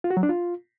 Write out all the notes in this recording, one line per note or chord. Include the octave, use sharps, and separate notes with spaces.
F4
F#4
F#3
D4
F4